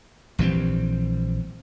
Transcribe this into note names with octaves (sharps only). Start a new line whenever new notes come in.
A#1 E3 G3 C4